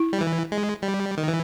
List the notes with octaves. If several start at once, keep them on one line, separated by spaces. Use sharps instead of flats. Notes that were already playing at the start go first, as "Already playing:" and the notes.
Already playing: E4
G3
E3
G#3
G3
D#3
E3